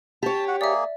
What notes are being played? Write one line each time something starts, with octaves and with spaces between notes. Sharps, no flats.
G4 C#5 A5
F#4 F#5
A#3 G#4 D5 E5